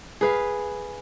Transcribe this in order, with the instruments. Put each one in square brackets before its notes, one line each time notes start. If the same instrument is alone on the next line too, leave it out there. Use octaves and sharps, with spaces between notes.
[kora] G#4 B4 F5